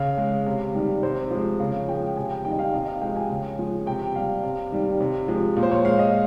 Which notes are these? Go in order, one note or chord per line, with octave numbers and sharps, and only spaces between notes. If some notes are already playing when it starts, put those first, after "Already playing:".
Already playing: C#3 F5
G#3
C3
D#3 G3
C3 C5
F3 G#3
C#3 F5
F3 G#3 G5
C3 G#5
G5
D#3 G3 G5
D#5
F5
C3 D#5
F5
F3 G#3 G5
G#5
C#3
F3 G#3
C3 G5
G3 F5
C3
D#3 G3
C3
F3 G#3
A#2
C5
C#5
G#3 F5
D#5